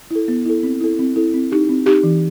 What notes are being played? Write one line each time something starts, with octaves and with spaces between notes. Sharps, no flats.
E4 A4
B3
E4 A4
C4
E4 A4
C4
E4 A4
C4
D#4 G4
C4
D#4 G4
E3